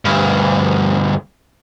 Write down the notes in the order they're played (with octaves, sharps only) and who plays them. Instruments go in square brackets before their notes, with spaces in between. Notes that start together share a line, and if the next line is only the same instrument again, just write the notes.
[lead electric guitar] D2 G2